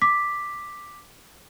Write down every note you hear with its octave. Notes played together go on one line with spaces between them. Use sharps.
D6 B6